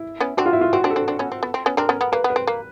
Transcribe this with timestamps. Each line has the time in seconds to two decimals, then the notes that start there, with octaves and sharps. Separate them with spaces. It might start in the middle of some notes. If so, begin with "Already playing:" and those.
Already playing: E4
0.20 B3 C#4
0.37 C4 D4 F#4
0.46 F4
0.53 E4
0.61 F4
0.73 C4 F#4
0.84 C4 D4
0.90 A4
0.96 C4 D4
1.08 C4 D4
1.19 B3 C#4
1.32 C4
1.43 B3
1.54 C4
1.66 B3 C#4
1.77 C4 D4 A#4
1.89 B3 C#4
2.01 B3
2.12 A#3 B4
2.24 B3
2.30 B4
2.36 C4
2.47 A#3